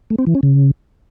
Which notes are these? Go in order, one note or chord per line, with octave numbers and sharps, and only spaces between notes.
A3
C4
E3
C#4
C#3